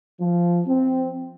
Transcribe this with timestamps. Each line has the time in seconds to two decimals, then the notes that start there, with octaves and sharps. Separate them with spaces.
0.19 F3
0.67 C4